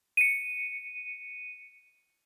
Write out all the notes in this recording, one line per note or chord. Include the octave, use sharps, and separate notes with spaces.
C#7 D#7